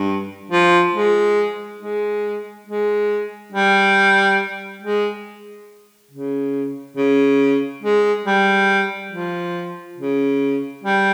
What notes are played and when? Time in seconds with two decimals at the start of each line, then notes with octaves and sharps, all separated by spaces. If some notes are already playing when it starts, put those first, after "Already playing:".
Already playing: G2
0.51 F3
0.94 G#3
1.80 G#3
2.67 G#3
3.53 G3
4.82 G#3
6.11 C#3
6.97 C#3
7.83 G#3
8.26 G3
9.12 F3
9.98 C#3
10.84 G3